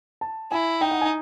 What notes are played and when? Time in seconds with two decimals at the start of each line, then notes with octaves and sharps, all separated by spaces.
0.21 A5
0.51 E4 G#5
0.81 D#4 G5
0.91 F#5
1.01 G#5